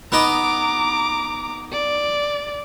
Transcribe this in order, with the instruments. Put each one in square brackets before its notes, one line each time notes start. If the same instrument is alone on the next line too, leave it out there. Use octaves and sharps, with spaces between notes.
[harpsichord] B3 D#4 [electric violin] A#5 D6
[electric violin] D5